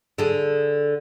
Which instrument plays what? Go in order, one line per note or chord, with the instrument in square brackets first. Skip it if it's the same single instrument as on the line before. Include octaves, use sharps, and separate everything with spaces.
[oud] D3 G#4